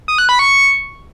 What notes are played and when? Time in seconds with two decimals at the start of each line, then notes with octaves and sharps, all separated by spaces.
0.08 D#6
0.18 F#6
0.29 B5
0.39 C#6